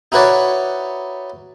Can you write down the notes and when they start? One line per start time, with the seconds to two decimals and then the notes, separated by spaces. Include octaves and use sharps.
0.12 D#4 E4 F#4 B4 C#5 D5